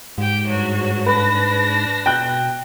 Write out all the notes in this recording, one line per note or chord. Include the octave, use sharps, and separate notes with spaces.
G#2 G4 G5
G2 F#3 F#4
D4 B4 B5 A#6
B2 G5 F#6